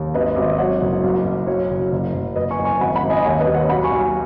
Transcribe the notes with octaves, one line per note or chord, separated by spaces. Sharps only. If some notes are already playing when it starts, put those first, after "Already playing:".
Already playing: D#2
G#1 B4 D#5
G#1
D#5
F#3 C#5 F#5
F#1
B1
B1
F#3 C#5
F#1
F#1
F#1
F#1 B4 D#5
G#5 C#6
F#1
G#5 C#6
G#1 F#5 B5
F#5 B5
G#1
D#5 G#5
D#2 C#5 F#5
B4 D#5
D#2
C#5 F#5
B1 F#5 B5
G#5 C#6
B1